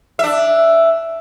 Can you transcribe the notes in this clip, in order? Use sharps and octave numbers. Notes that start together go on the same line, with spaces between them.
D4 E5